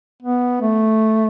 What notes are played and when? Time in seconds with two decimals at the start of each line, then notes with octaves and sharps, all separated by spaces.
0.23 B3
0.62 A3